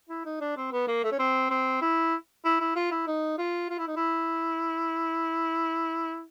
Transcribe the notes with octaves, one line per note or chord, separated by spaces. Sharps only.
E4
D#4
D4
C4
B3
A#3
A3
C#4
C4
C4
E4
E4
E4
F4
E4
D#4
F4
F4
E4
D#4
E4